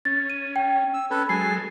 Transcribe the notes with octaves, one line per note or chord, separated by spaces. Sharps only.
C#4 A6
D#7
G5
E6
C#4 A4 B4
F#3 G#3 A4 G#5 C7